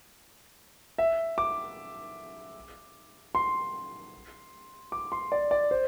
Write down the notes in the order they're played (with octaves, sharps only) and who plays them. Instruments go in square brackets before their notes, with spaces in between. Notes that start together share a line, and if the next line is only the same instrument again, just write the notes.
[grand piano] E5
D6
C6
D6
C6
D5
D5
C5